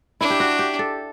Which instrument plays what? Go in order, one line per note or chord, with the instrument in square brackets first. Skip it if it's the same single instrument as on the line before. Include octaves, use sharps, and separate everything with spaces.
[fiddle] D4 [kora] E4
[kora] G4
F#4
G4
A4